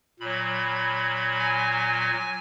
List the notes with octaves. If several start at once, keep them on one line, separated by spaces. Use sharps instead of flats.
A#2 F#3 B5
G#5